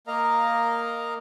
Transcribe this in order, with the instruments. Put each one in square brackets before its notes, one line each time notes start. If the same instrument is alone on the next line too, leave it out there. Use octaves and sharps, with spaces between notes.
[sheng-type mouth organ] A#3 A#4 D#5 F5 A#5